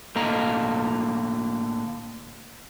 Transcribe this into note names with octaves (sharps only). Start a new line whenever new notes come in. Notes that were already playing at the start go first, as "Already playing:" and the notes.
A2 D3 A#3 D#5 A#5